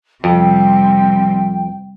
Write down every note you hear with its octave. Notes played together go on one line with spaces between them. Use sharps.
F2 C3 G3 G5